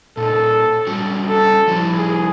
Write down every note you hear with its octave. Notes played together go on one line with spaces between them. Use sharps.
A#2 D#4 A4
G3 C#4 F#4
A4
F3 G3 E4
G#4